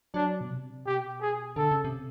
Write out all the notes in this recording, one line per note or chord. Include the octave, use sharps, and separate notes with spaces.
F#3 D4
B2
C3
B2 G4
G#4
D3 A4
C#3
C3